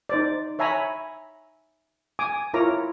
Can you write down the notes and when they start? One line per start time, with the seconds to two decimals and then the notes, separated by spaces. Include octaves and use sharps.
0.09 D#4 C5 D5
0.59 C#5 E5 G#5 A#5 B5
2.19 G#5 D6 D#6
2.54 E4 F4 A#4 C#5 A#5 D6